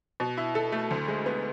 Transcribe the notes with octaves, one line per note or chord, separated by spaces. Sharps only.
B2
E4
A4
A3
D2
G#3
B3